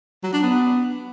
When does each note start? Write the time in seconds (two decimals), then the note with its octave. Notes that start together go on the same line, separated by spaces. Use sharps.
0.23 F#3
0.33 D4
0.43 B3